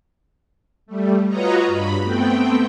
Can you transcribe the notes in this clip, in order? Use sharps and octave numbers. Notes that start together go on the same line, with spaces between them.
G3 A3
F4 F#4 B4 C#5 D#5 A#5
G2 B5
A3 B3 C4 G5